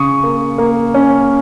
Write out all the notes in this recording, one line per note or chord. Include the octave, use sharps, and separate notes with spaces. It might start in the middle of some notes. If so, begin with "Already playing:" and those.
Already playing: C#3 C#6 D#6
A#3
A#3
C#4